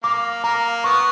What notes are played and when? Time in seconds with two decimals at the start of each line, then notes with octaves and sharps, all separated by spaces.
0.03 A#3 D6
0.44 A#3 A#5
0.84 B3 C#6